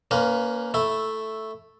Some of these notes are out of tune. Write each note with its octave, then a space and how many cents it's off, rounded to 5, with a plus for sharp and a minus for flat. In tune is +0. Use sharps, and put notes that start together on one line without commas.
A#3 +0 C#4 +30 B4 +25
A3 +0 E4 +0